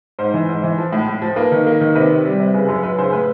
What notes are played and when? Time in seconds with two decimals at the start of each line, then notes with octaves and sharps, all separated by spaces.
0.19 G#2 C5
0.34 E3
0.49 G#2
0.64 E3
0.78 F3
0.93 A2
1.08 A2
1.22 F3
1.36 A#3 B4
1.52 D#3
1.67 A#3
1.81 D#3
1.95 C3 B4
2.10 C3
2.25 G3
2.40 C3
2.54 C#3 B4
2.68 F#2 B4
2.83 F#2 B4
2.98 C#3 C5
3.13 A2 B4